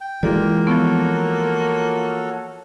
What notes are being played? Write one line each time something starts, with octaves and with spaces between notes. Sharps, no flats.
G5
E3 G#3 A#3 F4 F#4 A4 D5
F3 B3 F#4 A4 C#5